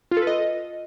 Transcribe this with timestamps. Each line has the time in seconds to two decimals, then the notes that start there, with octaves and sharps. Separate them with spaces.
0.11 F4
0.17 A4
0.22 B4
0.27 D#5